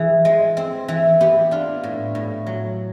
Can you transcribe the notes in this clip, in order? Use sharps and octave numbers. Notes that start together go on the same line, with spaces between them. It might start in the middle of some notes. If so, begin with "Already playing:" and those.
Already playing: E3 G#4
G#3
C4
E3
B3 G4
D4 F4
A2
A2
F#3